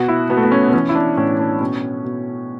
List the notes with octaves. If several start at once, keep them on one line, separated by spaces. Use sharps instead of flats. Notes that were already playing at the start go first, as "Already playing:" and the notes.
Already playing: B2 F#4
E4
B2 B3
A3
B3
C#4
B3
E3 C#4
E4
D4
A2 C#4
D4
B2 C#4
B2